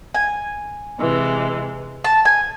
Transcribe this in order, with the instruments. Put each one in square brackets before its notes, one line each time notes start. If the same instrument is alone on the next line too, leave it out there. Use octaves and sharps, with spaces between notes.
[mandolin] G#5
[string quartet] C3 E3 G#3
[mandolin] A5
G#5